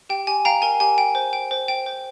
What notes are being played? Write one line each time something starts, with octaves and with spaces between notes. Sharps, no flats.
G4 G5
G4 G#5
F5 G5 A#5
A#4 G#5
G4 G#5
G5
C5
G5
C5
G5
C5